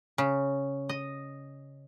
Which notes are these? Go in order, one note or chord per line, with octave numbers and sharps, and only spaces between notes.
C#3
D#5